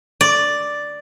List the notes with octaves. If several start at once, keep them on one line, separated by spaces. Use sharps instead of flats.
D5